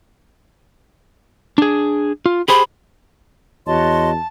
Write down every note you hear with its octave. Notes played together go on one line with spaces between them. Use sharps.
D4 G#4
F4
G4 G#4 C5 B5
E2 F#4 C#5 D#5 A5 C6